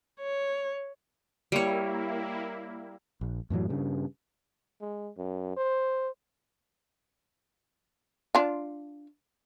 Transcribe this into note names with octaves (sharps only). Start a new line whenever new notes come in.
C#5
G3 A#3 E4 C#5
A#1
F#2 A2 E3 F#3
G2 C#3
G#3
F#2
C5
D4 F4